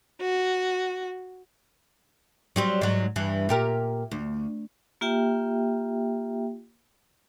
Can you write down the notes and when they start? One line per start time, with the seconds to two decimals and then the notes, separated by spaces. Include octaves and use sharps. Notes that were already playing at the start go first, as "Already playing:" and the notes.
0.22 F#4
2.56 F#3 G3 C4
2.81 G#2 F#3
3.16 G2 E3
3.49 A#2 G4 A#4
4.11 D2
5.01 A#3 F4 G4 E5 G5